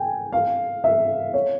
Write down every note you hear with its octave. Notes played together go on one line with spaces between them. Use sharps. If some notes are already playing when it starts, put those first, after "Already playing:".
Already playing: G5 G#5
F5
E5
C#5